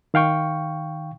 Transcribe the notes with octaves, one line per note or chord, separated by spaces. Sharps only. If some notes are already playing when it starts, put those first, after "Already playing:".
D#3 F5 G5 C#6